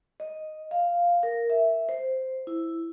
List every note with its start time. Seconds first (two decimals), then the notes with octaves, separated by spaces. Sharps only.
0.20 D#5
0.71 F5
1.23 A#4
1.50 E5
1.89 C5
2.47 E4